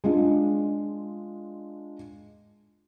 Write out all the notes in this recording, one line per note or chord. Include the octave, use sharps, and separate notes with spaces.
G#3 D4 F4